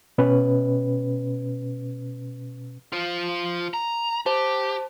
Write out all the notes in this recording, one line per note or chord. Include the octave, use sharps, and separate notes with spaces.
B2 C#4 B4
F4 C5
A#5
G4 C5 A5